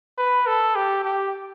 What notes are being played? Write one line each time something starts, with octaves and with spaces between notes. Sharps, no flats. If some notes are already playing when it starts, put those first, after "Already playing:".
B4
A4
G4
G4